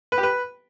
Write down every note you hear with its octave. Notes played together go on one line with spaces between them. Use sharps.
B4
G4
B4